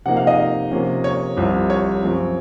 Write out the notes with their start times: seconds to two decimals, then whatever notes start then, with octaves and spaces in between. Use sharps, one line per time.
0.06 C3 F3 A#3 D#4 F#5
0.17 F5
0.27 D#5
0.71 C3 F3 A#3 C#4
1.04 C#5
1.37 C2 C3 F3 C4
1.70 C#5
2.03 F#2 F3 C4